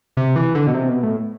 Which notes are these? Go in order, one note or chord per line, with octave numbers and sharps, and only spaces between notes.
C3
E3
D3
B2
C3
B2
A2